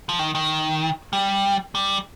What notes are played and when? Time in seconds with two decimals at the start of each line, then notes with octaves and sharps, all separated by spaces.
0.09 F3
0.19 D#3
0.35 D#3
1.13 G3
1.75 G3